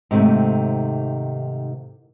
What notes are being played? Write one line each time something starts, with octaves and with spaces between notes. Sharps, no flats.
G#2 C3 D#3 A3